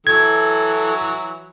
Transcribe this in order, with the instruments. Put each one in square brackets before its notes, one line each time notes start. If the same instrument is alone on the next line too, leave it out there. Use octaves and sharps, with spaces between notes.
[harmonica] E3 F#3 [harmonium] A4 [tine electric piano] G#6